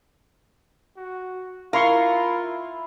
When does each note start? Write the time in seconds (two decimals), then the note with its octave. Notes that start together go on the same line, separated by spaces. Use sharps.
0.97 F#4
1.73 E4 F4 A#4 F5 C6 C#6